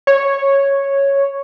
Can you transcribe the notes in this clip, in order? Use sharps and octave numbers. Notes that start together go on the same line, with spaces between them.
C#5